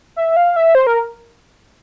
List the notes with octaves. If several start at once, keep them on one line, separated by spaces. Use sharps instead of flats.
E5
F5
E5
C5
A#4